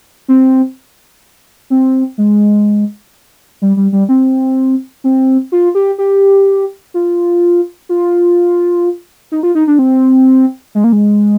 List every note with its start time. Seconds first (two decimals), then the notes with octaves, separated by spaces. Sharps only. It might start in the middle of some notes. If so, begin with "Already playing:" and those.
0.28 C4
1.70 C4
2.18 G#3
3.62 G3
3.77 G3
3.92 G3
4.09 C4
5.04 C4
5.52 F4
5.75 G4
5.98 G4
6.94 F4
7.89 F4
9.32 D#4
9.43 F4
9.55 D#4
9.68 D4
9.79 C4
10.75 G#3
10.84 A#3
10.92 G#3